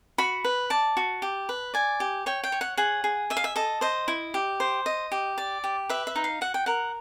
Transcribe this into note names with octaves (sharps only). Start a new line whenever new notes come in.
F#4 B5
B4
D5 A5
F#4
G4
B4
D5 G#5
G4
C#5 G5
G5
C#5
F#5
G#4 F#5
G#4
D#5 E5
F5
E5
A4 D#5
C5 D#5
E4
G4
C5
D#5
G4
D5
G4
B4 E5
E5
D#4
F5
F#4 F#5
G5
A#4 F#5